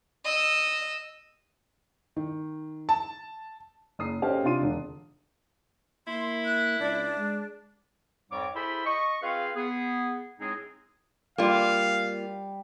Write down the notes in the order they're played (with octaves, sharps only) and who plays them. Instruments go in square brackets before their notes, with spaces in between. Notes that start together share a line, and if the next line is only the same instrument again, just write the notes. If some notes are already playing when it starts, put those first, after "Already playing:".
[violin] D#5 E6
[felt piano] D#3
A5
[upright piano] F#1 D#6 C7
C#4 G4 A4 C5 D#5 F5
C3 D4 D#4 F4 C6 D#7
E1 D3
[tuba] A#3 [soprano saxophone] E4 [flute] C6
[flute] F#6
[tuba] C#2 [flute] D4
[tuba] G#3
[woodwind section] F2 G#2 G3 C#5 D6
E4 G#4 A4 C5 B5
D#5 C#6
C4 F4 G#4 B4 F5
B3 G#4
A2 G#3 C4 D#4 G#4
[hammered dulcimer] G3 G5 [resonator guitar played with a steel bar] A#3 F4 [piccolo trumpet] F5